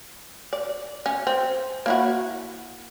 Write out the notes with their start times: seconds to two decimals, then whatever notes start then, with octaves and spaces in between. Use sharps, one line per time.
0.53 D5
1.06 C#4
1.27 C4
1.86 A#3 E4 F#4